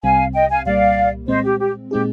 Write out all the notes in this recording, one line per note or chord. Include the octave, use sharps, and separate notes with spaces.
C2 C3 G3 C4 F5 G#5
D#5 G5
F5 G#5
C2 A#2 G3 A#3 D5 F5
A#2 G#3 C4 C5 D#5
G4
G4
A#2 G#3 C4 D#4 G4 G#4